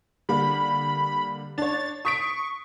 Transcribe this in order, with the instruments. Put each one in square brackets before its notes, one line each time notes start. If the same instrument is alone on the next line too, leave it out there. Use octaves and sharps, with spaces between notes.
[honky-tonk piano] D3 G3 A#3 [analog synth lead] B5
[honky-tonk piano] D4 C#5 [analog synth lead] A6
[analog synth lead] C#6 [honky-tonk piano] D#6 B6 D7